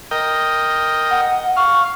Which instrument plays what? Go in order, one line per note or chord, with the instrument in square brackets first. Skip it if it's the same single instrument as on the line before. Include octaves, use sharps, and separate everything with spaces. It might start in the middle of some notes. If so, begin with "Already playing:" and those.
[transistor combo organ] A#4 D#5 G5
[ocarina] F#5
[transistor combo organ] F5 [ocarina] C#6